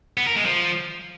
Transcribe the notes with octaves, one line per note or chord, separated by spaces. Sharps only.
B3
A#4
G#3
F3